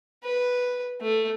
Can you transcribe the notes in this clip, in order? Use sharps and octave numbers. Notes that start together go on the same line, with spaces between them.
B4
A3